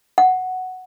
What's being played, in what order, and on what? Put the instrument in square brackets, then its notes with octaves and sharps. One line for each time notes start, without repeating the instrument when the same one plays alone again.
[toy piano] F#5